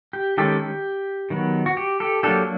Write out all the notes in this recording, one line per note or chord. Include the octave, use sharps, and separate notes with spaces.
G4
D#3 G#3 C#4 G4 A4
G4
D#3 F#3 B3
F#4
G4
G4 A4
F#3 A#3 D4 G4 A4